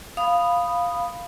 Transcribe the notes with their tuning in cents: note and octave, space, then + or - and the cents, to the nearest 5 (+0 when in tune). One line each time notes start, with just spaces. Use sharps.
F5 +0 B5 +0 D#6 -10